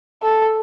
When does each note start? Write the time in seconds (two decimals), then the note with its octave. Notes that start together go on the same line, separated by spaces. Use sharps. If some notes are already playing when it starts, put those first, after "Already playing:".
0.23 A4